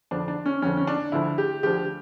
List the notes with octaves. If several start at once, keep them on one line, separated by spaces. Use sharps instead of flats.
F2 D3 F3 D4
D4
C#4
F2 D3 F3 C#4
C#4
D4
D2 D3 F3 E4
G4
D2 D3 F3 G4